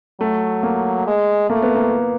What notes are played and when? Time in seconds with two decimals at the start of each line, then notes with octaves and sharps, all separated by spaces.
0.20 F#3 A3
0.63 A#3
1.07 G#3
1.50 A3 A#3
1.62 B3
1.75 A#3